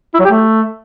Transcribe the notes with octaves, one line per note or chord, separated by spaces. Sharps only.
E4
F#3
G4
A3